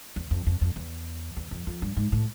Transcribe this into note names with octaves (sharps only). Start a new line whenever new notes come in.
E2
F2
F2
F2
E2
E2
F2
F2
G2
G#2
A2